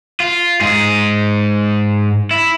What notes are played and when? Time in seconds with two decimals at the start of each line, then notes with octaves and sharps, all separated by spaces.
0.20 F4
0.61 G#2 G#4
2.31 E4